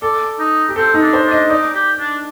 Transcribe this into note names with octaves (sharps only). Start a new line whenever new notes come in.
A4 D5
D#4
G4
C4 A4
D#4
D4
C5
D4
D#5
D#4 D5
G4
D4